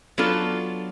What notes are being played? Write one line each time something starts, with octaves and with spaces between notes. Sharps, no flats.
F#3 B3 D4 F4 A4